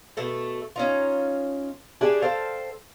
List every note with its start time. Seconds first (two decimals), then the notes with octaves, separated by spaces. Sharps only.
0.17 B2 A3 A4
0.76 C#4 D#4 F4
2.01 D4 E4 G4 G#4
2.22 A4 C5 F5 G5